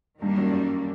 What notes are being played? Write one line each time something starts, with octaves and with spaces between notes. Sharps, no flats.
G2 D#3 G3 A#3 D4
F#2
F#2